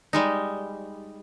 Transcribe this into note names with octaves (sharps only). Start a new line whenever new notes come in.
G3 G#3 D#4